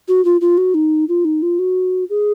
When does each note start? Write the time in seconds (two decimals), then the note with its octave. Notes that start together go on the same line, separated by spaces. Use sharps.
0.08 F#4
0.25 F4
0.41 F4
0.57 F#4
0.74 D#4
1.09 F4
1.25 D#4
1.42 F4
1.59 F#4
2.10 G#4